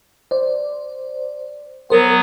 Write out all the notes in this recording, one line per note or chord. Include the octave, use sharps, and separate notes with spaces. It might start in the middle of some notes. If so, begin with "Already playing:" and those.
C5 D5
F#3 B3 A#4 C5